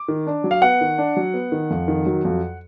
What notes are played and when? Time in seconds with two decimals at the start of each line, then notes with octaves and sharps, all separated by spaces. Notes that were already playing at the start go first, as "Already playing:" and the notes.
Already playing: D6
0.08 D#3
0.27 D4
0.44 F#3
0.51 F5
0.62 B3 F#5
0.81 D#3
0.98 D4
1.17 F#3
1.34 B3
1.52 D#3
1.70 F2
1.88 D#3
2.06 F#3
2.25 F2